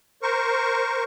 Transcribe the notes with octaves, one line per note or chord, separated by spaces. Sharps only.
A#4 C5 C#6